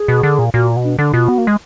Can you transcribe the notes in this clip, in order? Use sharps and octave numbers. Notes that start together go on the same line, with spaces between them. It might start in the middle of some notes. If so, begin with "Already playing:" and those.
Already playing: G#4
B2
D3
A#2
A#2 F#4
B2
D4
D3 D4
B2 F4
B3 F#4
A#3
G#3